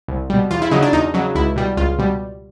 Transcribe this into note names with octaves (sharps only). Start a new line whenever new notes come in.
C2
B2 G3
E2 F4
E4
C#3 F#3 D#4
D4
E2 D#4
C#3 F#3
C#2 E4
B2 G3
C#2 F4
B2 G3